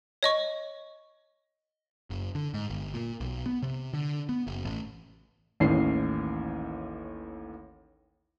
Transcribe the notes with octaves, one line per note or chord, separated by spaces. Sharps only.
C#5 D#5 C#6
F#1
D3
G#2
G1
A#2
B1
B3
C3
D3
B3
F#1
A1
A1 D#2 A2 E3 C#4 C7